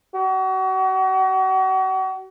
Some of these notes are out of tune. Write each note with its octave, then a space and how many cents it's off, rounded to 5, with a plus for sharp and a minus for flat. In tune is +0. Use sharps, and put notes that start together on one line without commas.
F#4 +35